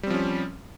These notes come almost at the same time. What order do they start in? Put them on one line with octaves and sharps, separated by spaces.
G3 C4 F3 C#4